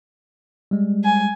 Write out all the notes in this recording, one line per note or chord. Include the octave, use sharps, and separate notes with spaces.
G3 G#3
G#5